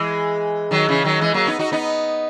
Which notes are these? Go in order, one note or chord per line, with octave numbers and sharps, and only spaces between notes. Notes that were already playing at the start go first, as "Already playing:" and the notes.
Already playing: E3 G#3
D#3 F#3
C#3 E3
D#3 F#3
E3 G#3
F#3 A#3
B3 D#4
D#4 F#4
B3 D#4